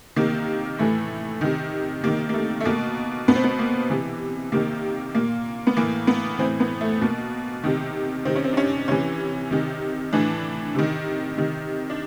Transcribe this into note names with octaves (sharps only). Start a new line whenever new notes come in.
C3 D#3 A#3
A2 E3 A3
C3 D#3
C3 D#3 A#3
A#3
A3
A3
B2 A#3
B2 B3
C4
B3
A#3
C3 E3
C3 D#3 A#3
A#2 A#3
B3
A2 E3 A#3
B3
A2 E3 C4
B3
A3
B2 A#3
C3 D#3
C3 D#3 C4
C#4
C4
D4
C#4
C3 E3 C#4
C3 D#3
A2 E3 D4
C3 D#3
C3 D#3
D4